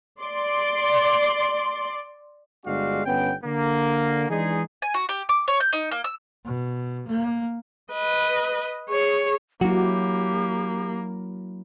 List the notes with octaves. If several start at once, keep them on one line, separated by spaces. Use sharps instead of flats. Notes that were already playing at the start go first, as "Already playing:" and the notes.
D5 C6
G1 G#3 D4 F#4 G4 F5
G1 B3 C#4 G5
D3 A#3
E3 G#3 D4 D#4 G#4
G#5
F#4
G4
D6
C#5
G6
D#4
A#3
E6
B2
A#3
B4 D#5
G#4 C#5
F#3 A#3 E4 F#4 G4